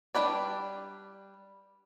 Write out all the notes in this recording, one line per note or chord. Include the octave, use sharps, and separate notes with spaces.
G3 D4 D#4 B4 D5